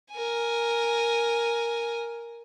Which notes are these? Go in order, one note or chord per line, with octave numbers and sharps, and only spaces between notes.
A#4 G#5